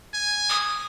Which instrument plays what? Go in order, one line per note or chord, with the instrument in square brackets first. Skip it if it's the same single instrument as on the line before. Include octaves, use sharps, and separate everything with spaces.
[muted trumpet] G#5
[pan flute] D#6